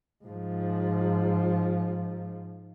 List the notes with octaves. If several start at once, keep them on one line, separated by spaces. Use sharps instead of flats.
G#2 F3